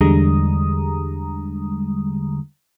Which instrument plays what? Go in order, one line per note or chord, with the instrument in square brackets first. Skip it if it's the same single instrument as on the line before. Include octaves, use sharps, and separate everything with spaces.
[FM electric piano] E2 D3 G3 G#3 A#5 D#6